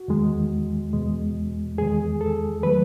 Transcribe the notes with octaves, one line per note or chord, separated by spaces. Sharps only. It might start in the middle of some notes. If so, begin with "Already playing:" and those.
Already playing: F#4
E2 D#3 G#3
E2 B2 G#3
E2 D#3 G#3 G#4
A4
D#3 F#3 A3 B4